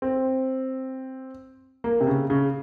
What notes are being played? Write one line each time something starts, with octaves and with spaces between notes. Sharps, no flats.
C4
A#3
C3
C#3
C#3